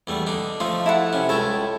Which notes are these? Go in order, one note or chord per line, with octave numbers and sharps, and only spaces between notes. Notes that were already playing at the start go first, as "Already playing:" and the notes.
E2 G3 A3
D3 D4 D#4
F3 A3 D#4 F4
E4 A4 F#5
C3 C#4
C#2 E4 A4 C#5 G5